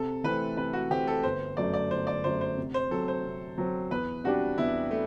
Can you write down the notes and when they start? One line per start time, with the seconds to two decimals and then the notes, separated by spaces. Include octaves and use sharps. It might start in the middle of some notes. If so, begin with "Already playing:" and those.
Already playing: C3 A4
0.24 E3 A3 C4 B4
0.57 C3 B4
0.73 F#4
0.90 E3 A3 C4 G4
1.07 A4
1.23 G1 C5
1.57 F#2 F#3 A3 D5
1.73 D5
1.91 G1 C5
2.07 D5
2.24 F#2 F#3 A3 C5
2.41 C5
2.57 C3
2.74 C5
2.91 F#3 C4 A4
3.08 C5
3.24 C3
3.58 F#3 C4
3.91 E2 B4
4.24 C3 G3 D4 F#4 G4
4.58 E2 E4
4.91 A3